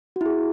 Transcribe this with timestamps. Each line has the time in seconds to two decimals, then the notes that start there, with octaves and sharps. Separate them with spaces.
0.16 F#4
0.21 E4
0.26 G#4